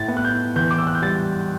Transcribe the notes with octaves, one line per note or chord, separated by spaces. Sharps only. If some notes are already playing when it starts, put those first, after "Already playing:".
Already playing: A2 A6
B3
F#6
G6
E2 G6
D6
E6
F#6
G6
G3 A6